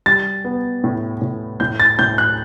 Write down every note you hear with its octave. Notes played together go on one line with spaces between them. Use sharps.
G3 A6
B3
A2
A2
A2 G6
A6
A2 G6
F#6